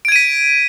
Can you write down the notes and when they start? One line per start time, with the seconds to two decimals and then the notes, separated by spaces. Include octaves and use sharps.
0.05 D7
0.08 G#6
0.12 D#7
0.16 B6